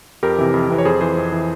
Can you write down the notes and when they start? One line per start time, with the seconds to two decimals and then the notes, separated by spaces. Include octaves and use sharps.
0.23 F2 G4 A#4
0.38 C3 E3
0.54 F2
0.70 C3 E3
0.78 C#5
0.85 F2 G#4 C5
1.01 E3 G#4 C5
1.17 F2
1.32 E3